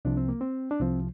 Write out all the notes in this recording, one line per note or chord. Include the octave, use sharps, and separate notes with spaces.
C2 C3 F3 D4
C4
A#3
C4
D4
C2 C3 F3 C4